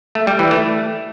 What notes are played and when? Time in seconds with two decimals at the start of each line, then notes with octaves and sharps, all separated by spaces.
0.15 A3
0.27 G3
0.39 E3
0.51 A3